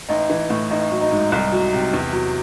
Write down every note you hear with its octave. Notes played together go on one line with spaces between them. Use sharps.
A1 D#4
E3
A2
A1 D#4
F#3
D#4
G#2
C2 D#4
F#3
C3
E2
F#3